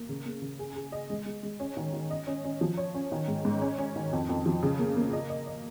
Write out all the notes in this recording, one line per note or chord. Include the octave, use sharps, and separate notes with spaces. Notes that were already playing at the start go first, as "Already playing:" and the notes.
Already playing: A#3
C#3
A#3
C#3
G#4
G#4
D#5
G#3
G#3
G#3
C#4
D#3
D#3
D#5
C#4
C#4
F3
C#5
C#4
D#3
G#2
G#2
C#4
C#4
D#3
F2
F2
F3
C#3
A#3
A#3
D#5
D#5
D#5